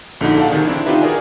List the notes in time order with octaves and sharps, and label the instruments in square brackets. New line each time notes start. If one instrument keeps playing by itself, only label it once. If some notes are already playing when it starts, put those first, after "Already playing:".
[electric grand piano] A#1 D3 D#4 F#4
A4 D5 F5 F#5 A5
C3 D#3 G#4
C4 D4 E4
D4 D#4 F4 G4 B4 E5
F#4 G#4 A#4 D5 G#5